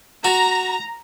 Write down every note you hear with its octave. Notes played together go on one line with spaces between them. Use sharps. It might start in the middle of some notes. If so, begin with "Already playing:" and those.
F#4 A#5